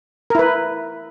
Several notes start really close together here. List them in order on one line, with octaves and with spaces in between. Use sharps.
A#4 E4 B4